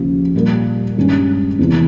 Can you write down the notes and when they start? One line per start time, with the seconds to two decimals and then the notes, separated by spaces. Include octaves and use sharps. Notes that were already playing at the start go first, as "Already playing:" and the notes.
Already playing: D#2 C#3 F3
0.35 A#1 A#2 G3 A#3
0.97 G2 D#3 G#3 C#4
1.59 E2 C3 E3